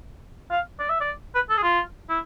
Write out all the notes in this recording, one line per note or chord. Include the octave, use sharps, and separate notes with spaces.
F5
D5
E5
D5
B4
A4
G#4
F4
E4